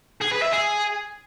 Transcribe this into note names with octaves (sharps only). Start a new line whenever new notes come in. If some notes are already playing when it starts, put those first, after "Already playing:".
G#4
B4
E5
G#4